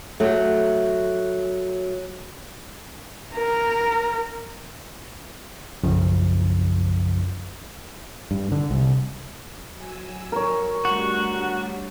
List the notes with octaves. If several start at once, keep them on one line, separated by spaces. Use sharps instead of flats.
F#3 A3
A#4
B1 F#2 C#3 F3
G2
D3
C2
F#3 G#5 E6
A#4 C#5
G3 A3 D4 F#4